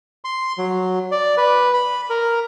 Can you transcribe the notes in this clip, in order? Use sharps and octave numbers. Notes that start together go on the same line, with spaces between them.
C6
F#3
D5
B4
B5
A#4